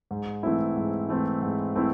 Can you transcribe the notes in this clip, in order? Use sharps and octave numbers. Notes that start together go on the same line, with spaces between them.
G#2
E3 A3 C4 E4
G#2
E3 A3 C4 E4
G#2
E3 A3 C4 E4